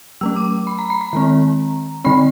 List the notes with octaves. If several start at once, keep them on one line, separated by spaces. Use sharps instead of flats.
F#3 A3 C#4 E6
D6
B5
A#5
B5
A#5
D#3 G#3 C4
D3 G3 C4 B5